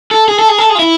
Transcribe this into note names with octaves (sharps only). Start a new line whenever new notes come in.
A4
G#4
A4
G#4
A4
G#4
F4
E4